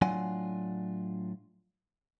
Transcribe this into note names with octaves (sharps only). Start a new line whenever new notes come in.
A2 F#3 D4 F4 F#5 G#5